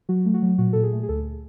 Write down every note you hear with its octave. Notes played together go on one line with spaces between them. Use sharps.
F#3 F#4
A3
F#4
F#3
A#2 F#4
A#2 A4
G#4
A3
G#4
D2 A4